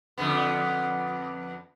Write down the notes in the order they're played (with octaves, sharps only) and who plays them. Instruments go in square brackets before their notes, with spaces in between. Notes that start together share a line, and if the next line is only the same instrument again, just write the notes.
[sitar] F2 D3 B3